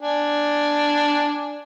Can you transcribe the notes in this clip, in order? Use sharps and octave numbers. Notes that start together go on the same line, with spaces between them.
D4 G#5